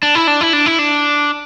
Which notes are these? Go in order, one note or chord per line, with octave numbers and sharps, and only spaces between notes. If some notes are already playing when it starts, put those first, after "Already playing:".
D4
E4
D4
E4
D4
E4
D4